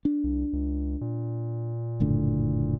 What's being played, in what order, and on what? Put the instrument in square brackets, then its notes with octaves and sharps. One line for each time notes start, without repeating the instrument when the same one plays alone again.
[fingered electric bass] D4
[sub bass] C2
C#2
A#2
[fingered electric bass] F#1 A2 D3